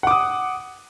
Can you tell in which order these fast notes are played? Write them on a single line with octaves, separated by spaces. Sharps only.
F#5 D6 D#6